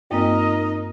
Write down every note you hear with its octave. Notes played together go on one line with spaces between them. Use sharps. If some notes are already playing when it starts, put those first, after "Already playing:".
G2 A#3 C4 D#4 A#4 D#5